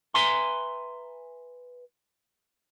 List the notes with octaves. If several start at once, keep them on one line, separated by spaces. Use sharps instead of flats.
B4 E5 G#5 A#5 C6